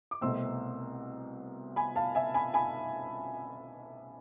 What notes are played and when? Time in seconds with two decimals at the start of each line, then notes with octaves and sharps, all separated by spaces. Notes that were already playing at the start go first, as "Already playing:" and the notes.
0.11 D6
0.21 C2 B2 A3 C4 C6 E6
1.76 G#5 B5
1.96 F5 A5
2.15 E5 G#5
2.34 G#5 B5
2.54 G#5 B5